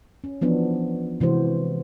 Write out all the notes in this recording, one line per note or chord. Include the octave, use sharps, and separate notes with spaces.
C#4
E3 F3 B3 D4
C3 E3 G#3 F#4 C5